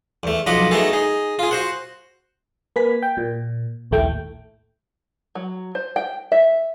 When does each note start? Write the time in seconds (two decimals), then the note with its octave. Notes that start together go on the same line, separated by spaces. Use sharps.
0.23 E2 A3
0.47 B1 F3 D#5 F#5 B5 D6
0.71 A3 B3 D#4 F#4 G#4 A4
0.93 D#4 G#4
1.39 F4 G#4
1.51 F#4 C5 F#5
2.76 A#3 B4 G#5 B6
3.03 G5
3.17 A#2
3.91 A#1 D#2 A2 A3 G5
5.35 F#3
5.75 C5
5.96 G5
6.32 E5